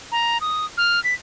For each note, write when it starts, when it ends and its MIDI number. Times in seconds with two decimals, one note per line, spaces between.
0.12 0.38 82
0.41 0.66 87
0.78 1.02 89
1.04 1.14 95